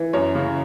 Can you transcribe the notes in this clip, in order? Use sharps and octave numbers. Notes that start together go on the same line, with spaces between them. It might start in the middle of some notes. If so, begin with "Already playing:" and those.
Already playing: E3
F#2 C#5
C#3